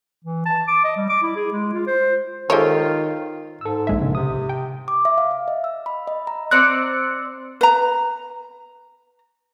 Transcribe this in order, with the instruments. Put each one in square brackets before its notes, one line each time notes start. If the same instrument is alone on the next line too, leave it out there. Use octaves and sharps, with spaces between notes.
[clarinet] E3
A5
D6
D#5
G3
D6
E4
G#4
G#3
F4
C5
[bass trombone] D#3 [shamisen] G#3 G4 C#5 [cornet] F4 [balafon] A4 C5
[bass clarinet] G#2 [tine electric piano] A4 E6
[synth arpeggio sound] A#1 G#3 E5
[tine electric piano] A#1 [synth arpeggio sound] C#3
[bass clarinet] C3 [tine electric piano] D#6
[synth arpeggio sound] G5
[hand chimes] D6
E5
F5
F5
D#5
E6
B5
D#5
A#5
[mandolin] C4 D5 [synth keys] F#6 C#7
[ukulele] B4 A#5